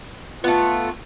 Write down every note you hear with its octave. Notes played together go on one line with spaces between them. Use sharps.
A3 B3 F4